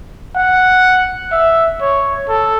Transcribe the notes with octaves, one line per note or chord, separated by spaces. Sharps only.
F#5
E5
C#5
A4